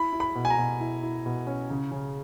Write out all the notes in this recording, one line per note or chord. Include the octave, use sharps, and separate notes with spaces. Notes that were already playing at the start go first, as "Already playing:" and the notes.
Already playing: E4 B5
E4
B5
B2
G#5
A#5
B2
E4
E4
B2
C#4
C#3
C#3